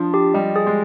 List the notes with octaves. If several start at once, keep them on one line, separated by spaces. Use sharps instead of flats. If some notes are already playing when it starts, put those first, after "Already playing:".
Already playing: F3 D4
G4
G3 D#5
G#4
G#3